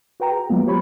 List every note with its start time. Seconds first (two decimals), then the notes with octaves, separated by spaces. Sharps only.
0.20 F#4 B4 G5 A#5
0.31 G#4
0.49 F#3 G#3 A#3 B3 F4
0.66 G4 C5 C#5 B5 C#6